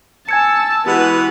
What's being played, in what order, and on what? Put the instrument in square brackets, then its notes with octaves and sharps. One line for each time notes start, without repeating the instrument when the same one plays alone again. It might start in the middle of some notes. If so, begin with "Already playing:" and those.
[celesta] G#5 G#6 C#7 [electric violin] A5 E6
[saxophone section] E3 G#3 B3 [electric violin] F#4 B4 [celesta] G4